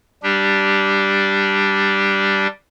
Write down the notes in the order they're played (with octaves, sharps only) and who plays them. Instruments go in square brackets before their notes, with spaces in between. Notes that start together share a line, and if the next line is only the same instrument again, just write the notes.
[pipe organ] G3 D4 G4